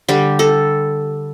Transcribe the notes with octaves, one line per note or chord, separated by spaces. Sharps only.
D3 G3 G4
A4